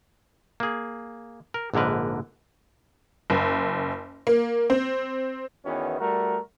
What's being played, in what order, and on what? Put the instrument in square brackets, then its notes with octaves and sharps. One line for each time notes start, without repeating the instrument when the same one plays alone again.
[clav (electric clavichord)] A#3 G#4
A#4
A#1 G#2 D3 A#4 B4
[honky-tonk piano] F#1
A#3
C4
[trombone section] E2 D#3 E3 B3 C#4 F#4
G3 A3 F#4 A#4